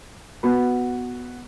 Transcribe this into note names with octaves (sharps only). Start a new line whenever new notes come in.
B3 F#4 B4